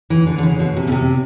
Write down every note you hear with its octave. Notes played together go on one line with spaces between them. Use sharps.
E3
D3
D3
C#3
B2
C3
C#3
C3